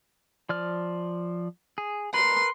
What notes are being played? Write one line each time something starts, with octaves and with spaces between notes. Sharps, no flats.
F3 D5 F6
G#4
A#4 B4 C6